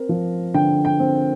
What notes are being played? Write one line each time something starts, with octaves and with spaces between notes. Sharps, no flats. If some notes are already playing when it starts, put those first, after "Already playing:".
Already playing: C4 A#4
F3
D3 G5
G5
C4